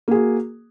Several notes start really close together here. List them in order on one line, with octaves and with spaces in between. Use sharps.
A#3 G#4 F#4